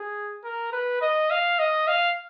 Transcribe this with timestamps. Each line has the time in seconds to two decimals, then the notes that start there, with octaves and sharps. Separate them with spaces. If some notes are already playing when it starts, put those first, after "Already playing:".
Already playing: G#4
0.44 A#4
0.73 B4
1.01 D#5
1.31 F5
1.59 D#5
1.87 F5